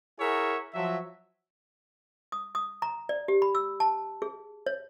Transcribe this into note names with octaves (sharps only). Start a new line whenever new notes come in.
E4 G#4 A#4 C#5 E5 F#5
F3 F#3 E5
D#6
D#6
A#5
D5
G4
B5
E6
A5
G#4
C#5